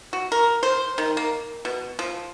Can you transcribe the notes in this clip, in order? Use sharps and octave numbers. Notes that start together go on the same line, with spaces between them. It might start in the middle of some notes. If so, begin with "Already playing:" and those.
F#4
A#4
C5
D#3
A#3
B2
F3